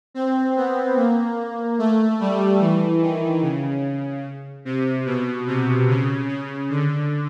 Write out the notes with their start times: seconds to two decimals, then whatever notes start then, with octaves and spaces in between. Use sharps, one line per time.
0.14 C4
0.57 B3
0.96 A#3
1.79 A3
2.20 G3
2.60 E3
3.01 D#3
3.42 C#3
4.65 C3
5.06 B2
5.47 C3
5.88 C#3
6.29 C#3
6.70 D3